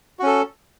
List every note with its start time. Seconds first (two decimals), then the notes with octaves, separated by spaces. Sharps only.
0.19 F#4
0.23 C#4
0.27 A4